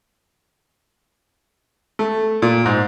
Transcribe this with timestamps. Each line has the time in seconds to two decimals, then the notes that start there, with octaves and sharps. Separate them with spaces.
1.99 A3
2.42 A#2
2.66 G#2